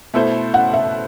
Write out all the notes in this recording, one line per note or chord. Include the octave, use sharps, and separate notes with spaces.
B2 A3 E4 A4 C5
F#5
E5